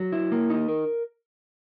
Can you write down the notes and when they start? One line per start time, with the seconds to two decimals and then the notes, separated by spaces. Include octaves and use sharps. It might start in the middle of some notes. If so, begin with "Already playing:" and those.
Already playing: F#3
0.12 E4
0.32 A#3
0.50 D#4
0.68 A#4